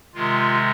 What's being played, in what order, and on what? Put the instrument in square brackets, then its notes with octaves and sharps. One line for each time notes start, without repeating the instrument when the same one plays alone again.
[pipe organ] C3 D#3 G#3 F4